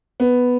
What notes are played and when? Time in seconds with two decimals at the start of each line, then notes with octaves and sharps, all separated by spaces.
0.20 B3